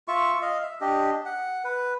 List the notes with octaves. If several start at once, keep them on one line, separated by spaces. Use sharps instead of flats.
F4 E5 C#6
D#5 F5
E5
D4 G4 D#5
F#5
B4